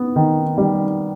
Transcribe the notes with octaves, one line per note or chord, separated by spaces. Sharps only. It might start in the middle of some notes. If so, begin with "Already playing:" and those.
Already playing: B3
D#3
G3